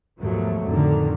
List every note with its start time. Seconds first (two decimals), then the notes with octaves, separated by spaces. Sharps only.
0.20 D#2 G#2 B2 F3 F#3 A3
0.68 F2 A2 D3 D#3